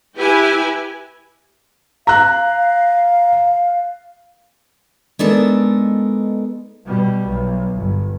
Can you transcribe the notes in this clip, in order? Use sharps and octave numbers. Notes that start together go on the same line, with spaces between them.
E4 G4 B4 G#5
F5 A#5 F#6
G#3 B3 D4 D#4 A4 A#4
B2 G3
B1
G1